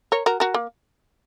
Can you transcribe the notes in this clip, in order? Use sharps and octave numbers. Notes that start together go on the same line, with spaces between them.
A#4 C#5
F#4 A#4
F#4 A#4
A#3